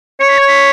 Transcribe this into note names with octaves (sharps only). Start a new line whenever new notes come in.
C#5 C#7
B6
G#6
B6